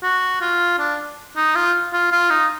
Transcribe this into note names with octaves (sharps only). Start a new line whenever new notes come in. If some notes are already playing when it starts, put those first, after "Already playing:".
F#4
F4
D4
D#4
F4
F4
F4
D#4